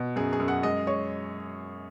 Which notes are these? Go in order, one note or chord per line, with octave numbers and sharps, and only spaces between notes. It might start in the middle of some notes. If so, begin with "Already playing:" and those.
Already playing: B2
F#2 G#4
G#4
F#2
F#5
G#3 D#5
G#3 C#5